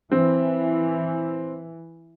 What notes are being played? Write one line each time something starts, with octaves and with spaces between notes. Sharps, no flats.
E3 C4